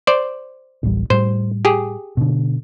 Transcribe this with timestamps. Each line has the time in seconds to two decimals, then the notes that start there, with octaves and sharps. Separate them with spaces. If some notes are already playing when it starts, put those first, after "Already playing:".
0.07 C5 D5
0.84 D1 A1 G3
1.10 A2 G3 C5
1.65 G4 G#4
2.17 B2 D3